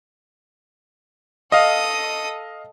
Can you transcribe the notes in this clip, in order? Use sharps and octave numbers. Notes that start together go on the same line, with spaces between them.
A4 D#5 F5 D#6